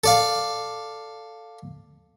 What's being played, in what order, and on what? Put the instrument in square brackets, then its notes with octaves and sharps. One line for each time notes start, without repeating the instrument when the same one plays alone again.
[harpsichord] A4 D5 F5